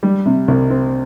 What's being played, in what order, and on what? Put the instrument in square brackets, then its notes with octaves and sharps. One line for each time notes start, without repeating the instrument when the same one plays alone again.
[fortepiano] G3
C3
C2
C4